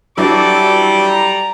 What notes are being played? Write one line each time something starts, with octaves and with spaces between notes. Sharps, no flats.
E3 F#3 G3 D4 A4 D6
A#5